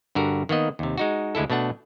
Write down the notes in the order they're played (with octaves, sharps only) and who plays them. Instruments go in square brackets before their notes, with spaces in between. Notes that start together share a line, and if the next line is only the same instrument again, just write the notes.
[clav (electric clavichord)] G2 D3 F#4 A#4
D#3 A#3 B3 D#5
D#2 C3
G#3 D#4 F#4
D2 G#3 E4 A4
B2 A3 D4 F#5